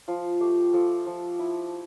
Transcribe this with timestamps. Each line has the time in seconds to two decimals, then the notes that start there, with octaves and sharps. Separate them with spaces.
0.08 F3 F4
0.41 A3 G4
0.74 F3 A4
1.07 F3
1.39 E4